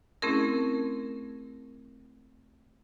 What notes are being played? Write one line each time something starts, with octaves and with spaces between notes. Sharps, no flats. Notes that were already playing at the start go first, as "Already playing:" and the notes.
A3 C4 C#4 E4 G#4 A#4